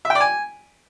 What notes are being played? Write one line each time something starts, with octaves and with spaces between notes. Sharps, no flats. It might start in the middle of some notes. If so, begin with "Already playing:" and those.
E5
G5
D5
G#5